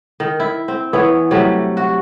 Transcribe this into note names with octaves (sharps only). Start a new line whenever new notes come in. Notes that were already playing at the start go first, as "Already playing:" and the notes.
D#3
E4
C4
E3 B3 C#5
C3 F#3 G3 A3
F#4